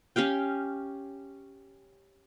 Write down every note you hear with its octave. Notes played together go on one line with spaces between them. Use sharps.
C#4 G4 F5 G5